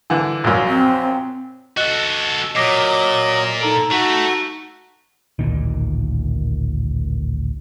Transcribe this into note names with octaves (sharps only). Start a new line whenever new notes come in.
D3 E3
A#1 F#2
C4
F#4 A4 D#5 F#6 G7
A#2 F#3 D#5 D6 C7
D#4 A4 A#5 D7
A3 F#4
A1 D2 A#2 D#3